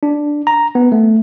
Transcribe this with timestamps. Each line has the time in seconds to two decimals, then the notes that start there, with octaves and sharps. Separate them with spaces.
0.03 D4
0.47 A#5
0.75 B3
0.92 A3